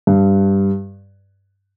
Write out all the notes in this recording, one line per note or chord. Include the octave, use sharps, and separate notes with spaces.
G2